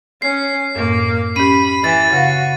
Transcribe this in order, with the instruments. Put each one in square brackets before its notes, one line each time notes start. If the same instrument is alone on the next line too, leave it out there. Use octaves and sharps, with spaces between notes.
[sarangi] C#4 [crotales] C7
[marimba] F#2 A2 [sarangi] A#3
[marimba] C#4 G4 [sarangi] B5 [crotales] D#7
[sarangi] E3 [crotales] A6
[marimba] C#3 F5 [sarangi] F#4